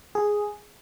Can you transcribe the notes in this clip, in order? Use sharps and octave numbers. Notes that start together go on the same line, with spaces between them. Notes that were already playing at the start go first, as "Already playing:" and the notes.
G#4